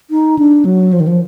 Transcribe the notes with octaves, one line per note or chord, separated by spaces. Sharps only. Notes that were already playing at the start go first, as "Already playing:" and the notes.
D#4
D4
F#3
F3
D#3
F3